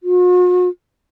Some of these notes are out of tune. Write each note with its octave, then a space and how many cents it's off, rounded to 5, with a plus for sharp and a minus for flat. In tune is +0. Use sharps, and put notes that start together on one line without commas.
F#4 -45